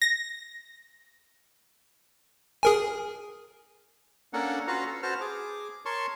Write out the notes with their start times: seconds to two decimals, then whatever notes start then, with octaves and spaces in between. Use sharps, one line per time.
0.02 A#6
2.63 G#4 A#4 G#5
4.33 A#3 C#4 D4 A4 A#4 F#5
4.67 C#4 F4 F#4 B4 F5 A#5
4.87 A4
5.03 F#4 B4 C5 A5 F6
5.21 G#4 D6
5.85 A#4 C#5 A5 C6 C#6